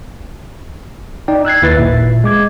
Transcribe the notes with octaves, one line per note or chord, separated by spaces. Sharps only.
D#4 D5 G5
E6 F#6 G#6 C7
D#2 E4 B4 A6
G#1 A#2 E5
G#3 D6 G#6